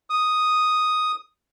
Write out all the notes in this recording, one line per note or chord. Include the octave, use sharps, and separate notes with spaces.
D#6